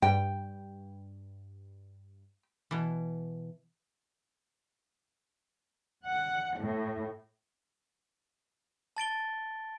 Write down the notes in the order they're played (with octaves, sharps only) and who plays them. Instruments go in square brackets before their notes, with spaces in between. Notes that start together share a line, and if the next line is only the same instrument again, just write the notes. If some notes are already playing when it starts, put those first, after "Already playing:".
[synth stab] G2 [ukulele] G5
[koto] B2 E3
[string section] F#5
A2
[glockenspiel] A5 A6 D7 G7